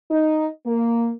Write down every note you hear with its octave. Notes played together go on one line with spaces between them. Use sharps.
D#4
A#3